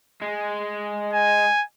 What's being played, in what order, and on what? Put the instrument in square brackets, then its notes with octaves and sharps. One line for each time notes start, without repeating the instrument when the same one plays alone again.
[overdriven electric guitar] G#3
[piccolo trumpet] G#5